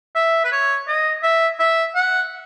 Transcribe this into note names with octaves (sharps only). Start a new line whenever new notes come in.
E5
B4
C#5
D#5
E5
E5
F#5